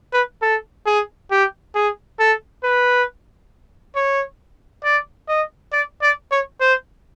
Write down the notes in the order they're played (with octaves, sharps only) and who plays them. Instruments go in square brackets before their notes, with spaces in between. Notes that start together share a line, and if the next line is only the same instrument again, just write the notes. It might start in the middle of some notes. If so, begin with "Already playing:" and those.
[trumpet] B4
A4
G#4
G4
G#4
A4
B4
C#5
D5
D#5
D5
D5
C#5
C5